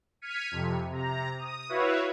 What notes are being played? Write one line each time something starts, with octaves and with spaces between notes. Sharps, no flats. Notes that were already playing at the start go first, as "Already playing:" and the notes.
F6 G#6 B6 C#7 D#7
F2 C3
C3 A#5
D#6
E4 F#4 B4 C#5 E5 F5